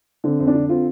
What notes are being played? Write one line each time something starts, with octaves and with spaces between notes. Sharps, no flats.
D3 C4
F2 C4
D4
D3
C4 F4